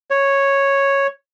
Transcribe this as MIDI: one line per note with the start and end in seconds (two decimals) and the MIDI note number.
0.11 1.07 73